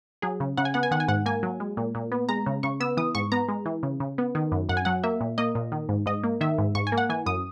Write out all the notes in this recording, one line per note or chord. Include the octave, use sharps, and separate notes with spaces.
F#3 G#4
C#3
C#3 F#5
G#5
B3 F#5
G#5
D#3 F#5
G#5
G#2 F#5
A#3 G#5
F#3
G#3
A#2
A#2
B3
G#3 A#5
C#3
C#3 C#6
B3 E6
E3 D#6
G#2 C#6
B3 A#5
G#3
E3
C#3
C#3
B3
D#3
F#2
F#2 F#5
G#5
F#3 F#5
A#3 E5
A#2
A#3 D#5
A#2
D#3
G#2
G#2 D#5
A#3
D#3 E5
G#2
G#2 C#6
G#5
A#3
F#5
E3 G#5
F#2 D#6